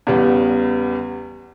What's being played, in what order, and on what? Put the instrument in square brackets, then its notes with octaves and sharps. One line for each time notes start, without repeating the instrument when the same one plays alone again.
[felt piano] E2 C#3 G3 B3